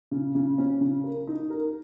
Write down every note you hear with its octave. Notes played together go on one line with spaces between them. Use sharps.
C#3
C#3
C#4
C#3
A#4
D#4
A#4